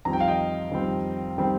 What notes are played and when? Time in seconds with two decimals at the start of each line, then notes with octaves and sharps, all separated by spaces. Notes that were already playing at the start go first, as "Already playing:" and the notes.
0.05 F2 D#3 G3 C4 A#5
0.13 G5
0.20 F5
0.28 D#5 G5
0.71 F2 D#3 G3 C4
1.38 D#3 G3 C4